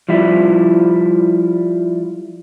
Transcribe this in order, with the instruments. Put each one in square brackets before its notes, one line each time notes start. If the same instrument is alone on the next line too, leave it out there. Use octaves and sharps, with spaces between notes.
[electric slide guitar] F3 G3 E4